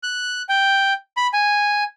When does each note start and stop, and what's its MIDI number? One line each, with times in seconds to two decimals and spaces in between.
0.03 0.42 90
0.49 0.93 79
1.17 1.27 83
1.34 1.83 80